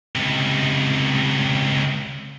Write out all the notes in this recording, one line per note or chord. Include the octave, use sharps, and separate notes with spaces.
C#2 C3